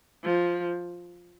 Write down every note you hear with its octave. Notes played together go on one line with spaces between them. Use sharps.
F3